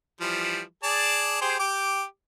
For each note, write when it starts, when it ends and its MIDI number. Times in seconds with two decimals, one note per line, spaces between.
0.21 0.61 52
0.21 0.61 53
0.21 0.61 55
0.83 1.39 68
0.83 1.39 74
0.83 1.39 81
1.42 1.57 67
1.42 1.57 68
1.42 1.57 72
1.59 2.03 67
1.59 2.03 86